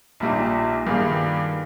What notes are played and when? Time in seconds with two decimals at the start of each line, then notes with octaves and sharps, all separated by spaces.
0.20 A#1 A#2 G3 A#3 D#4
0.87 G2 D#3 A#3 F4 G#4